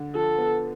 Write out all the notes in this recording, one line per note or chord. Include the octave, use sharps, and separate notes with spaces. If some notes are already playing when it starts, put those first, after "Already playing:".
Already playing: D3
F3 A4
B3